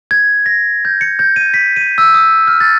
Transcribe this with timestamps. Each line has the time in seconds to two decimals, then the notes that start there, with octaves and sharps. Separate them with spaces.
0.11 G#6
0.46 A#6
0.85 G6
1.01 C#7
1.19 G6
1.36 D#7
1.54 B6
1.76 D#7
1.98 E6
2.15 D#6
2.47 F6
2.61 A6